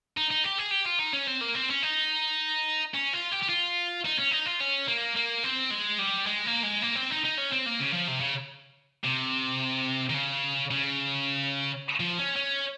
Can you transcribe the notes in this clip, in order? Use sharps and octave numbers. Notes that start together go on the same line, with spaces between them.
D#4
D#4
G4
G#4
G4
F4
D#4
C#4
C4
A#3
C4
C#4
D#4
C#4
F4
G4
G4
F4
D#4
C#4
D#4
F4
C#4
A#3
A#3
C4
G#3
G3
G#3
A#3
G#3
A#3
C4
D#4
D#4
C#4
C4
A#3
C#3
F3
C3
C#3
C3
D#3
C#3
C#3
F3
C#4
C#4